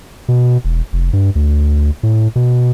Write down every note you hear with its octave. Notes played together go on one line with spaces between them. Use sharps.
B2
E1
F1
G2
D2
A2
B2